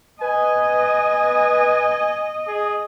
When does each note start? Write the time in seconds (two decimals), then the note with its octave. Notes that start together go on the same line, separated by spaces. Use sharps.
0.21 B4 D#5 G#5
2.47 G#4